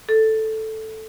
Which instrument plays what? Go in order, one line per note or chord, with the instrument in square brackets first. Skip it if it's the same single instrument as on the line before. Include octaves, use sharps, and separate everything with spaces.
[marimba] A4